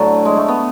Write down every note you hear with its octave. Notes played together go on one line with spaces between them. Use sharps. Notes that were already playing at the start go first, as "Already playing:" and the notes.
Already playing: A2 D3 F#3
G#3
A3
B3